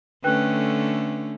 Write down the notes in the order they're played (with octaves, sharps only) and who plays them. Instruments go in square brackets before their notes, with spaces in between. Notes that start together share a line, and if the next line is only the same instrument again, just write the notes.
[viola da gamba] D3 A3 C#4 [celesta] B4 G5 F#6